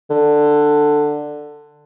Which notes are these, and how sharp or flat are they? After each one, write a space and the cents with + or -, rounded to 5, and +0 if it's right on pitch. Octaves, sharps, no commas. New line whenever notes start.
D3 +10